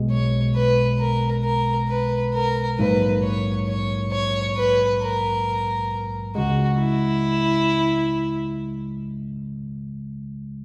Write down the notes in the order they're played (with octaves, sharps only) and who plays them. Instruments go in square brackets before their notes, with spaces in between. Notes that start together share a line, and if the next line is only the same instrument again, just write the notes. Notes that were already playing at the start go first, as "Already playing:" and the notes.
Already playing: [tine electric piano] B1 B2 G#3
[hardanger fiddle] C#5
B4
A#4
A#4
B4
A#4
[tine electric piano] A#1 G#2 F#3 A#3 [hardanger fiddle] B4
[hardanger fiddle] C#5
C#5
C#5
B4
A#4
[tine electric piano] C#2 C#3 G#3 [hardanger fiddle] F#4
[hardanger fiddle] E4